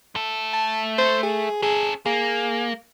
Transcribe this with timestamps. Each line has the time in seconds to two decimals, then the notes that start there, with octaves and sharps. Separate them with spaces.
0.15 A3 A4
0.53 A5
0.98 C5
1.23 G#4
1.62 C#4 G#4 A4
2.06 A#3 G#4